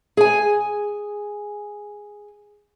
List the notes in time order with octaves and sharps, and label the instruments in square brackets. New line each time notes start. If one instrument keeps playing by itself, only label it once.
[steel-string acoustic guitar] G#4 G#5